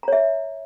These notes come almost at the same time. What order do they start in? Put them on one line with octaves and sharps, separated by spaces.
A#5 C#5 E5